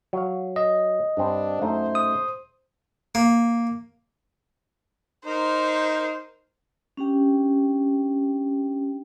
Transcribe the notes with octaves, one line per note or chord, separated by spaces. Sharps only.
F#3 F5
D#5
G2 C4 D4
F#2 A3 D#4 C5
D#6
A#3
D#4 A#4 C5
C#4 D4 G4 G5